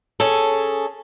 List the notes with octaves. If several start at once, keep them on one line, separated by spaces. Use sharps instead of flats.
C#4 G#4 A4